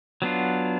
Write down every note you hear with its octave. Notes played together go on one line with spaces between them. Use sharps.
F#3 B3 D4 F4